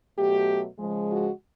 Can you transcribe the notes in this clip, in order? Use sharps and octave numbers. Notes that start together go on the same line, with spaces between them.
B2 F#3 A3 G4
C#3 F3 G#3
F#4